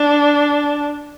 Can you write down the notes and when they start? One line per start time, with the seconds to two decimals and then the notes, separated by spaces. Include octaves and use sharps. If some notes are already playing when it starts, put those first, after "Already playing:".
Already playing: D4